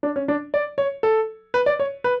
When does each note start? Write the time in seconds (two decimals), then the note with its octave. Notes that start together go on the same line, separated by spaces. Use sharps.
0.03 D4
0.16 C#4
0.28 D4
0.54 D5
0.78 C#5
1.03 A4
1.54 B4
1.66 D5
1.80 C#5
2.04 B4